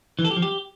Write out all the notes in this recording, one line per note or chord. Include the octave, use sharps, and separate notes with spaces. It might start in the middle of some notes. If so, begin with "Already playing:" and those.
E3
A4
G4
F3
G4